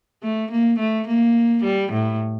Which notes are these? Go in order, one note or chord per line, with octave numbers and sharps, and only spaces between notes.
A3
A#3
A3
A#3
G3
A2